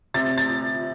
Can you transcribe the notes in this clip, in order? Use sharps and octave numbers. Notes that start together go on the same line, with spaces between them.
C3 A6
A6